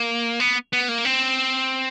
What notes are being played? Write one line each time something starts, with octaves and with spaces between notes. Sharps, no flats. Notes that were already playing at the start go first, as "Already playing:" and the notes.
Already playing: A#3
B3
B3
A#3
C4